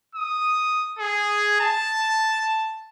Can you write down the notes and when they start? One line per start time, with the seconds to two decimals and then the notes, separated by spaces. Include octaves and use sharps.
0.15 D#6
0.99 G#4
1.61 A5